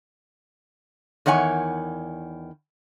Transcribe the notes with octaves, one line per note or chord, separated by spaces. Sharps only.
E2 D#3 C#5 F#5 G#5